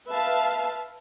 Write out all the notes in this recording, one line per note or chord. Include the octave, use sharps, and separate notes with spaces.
B4 E5 F5 A5